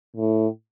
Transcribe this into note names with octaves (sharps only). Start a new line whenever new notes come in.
A2